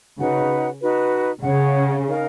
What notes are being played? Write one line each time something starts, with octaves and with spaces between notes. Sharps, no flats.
C#3 D#4 F#4 B4 F#5
D#4 F#4 B4
C#3 G#4 C#5 F#5
D#4 A#4 F5